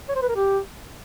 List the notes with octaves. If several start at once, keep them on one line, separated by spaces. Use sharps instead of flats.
C#5
C5
B4
A#4
G4